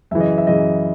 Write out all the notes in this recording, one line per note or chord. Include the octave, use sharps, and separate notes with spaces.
F#2 C#3 E3 E5
D#5
E5
F#2 C#3 E3 D#5